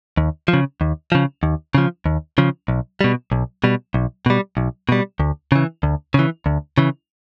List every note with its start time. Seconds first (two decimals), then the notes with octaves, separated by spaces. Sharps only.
0.17 D#2
0.48 F3
0.53 C#3
0.81 D#2
1.12 C#3 F3
1.43 D#2
1.75 C#3 F3
2.06 D#2
2.38 C#3 F3
2.68 B1
3.01 B2 G3
3.32 B1
3.64 B2 G3
3.94 B1
4.26 B2 G3
4.57 B1
4.89 B2 G3
5.20 D2
5.52 C#3 E3
5.83 D2
6.14 C#3 E3
6.46 D2
6.78 C#3 E3